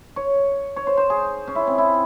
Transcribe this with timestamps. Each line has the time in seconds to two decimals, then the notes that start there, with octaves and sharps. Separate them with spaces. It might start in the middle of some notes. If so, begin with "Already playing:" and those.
0.16 C#5
0.76 C#5
0.87 C5
0.97 C5
1.10 G#4
1.48 C#4
1.55 E4
1.67 C4
1.78 E4